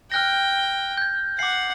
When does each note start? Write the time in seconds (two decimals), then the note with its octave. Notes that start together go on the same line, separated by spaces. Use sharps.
0.12 G5 F6 F#6 A#6
0.97 G6 G#6
1.39 F#5 D6 C7